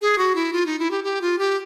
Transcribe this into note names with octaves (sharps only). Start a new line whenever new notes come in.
G#4
F#4
E4
F4
D#4
E4
G4
G4
F4
G4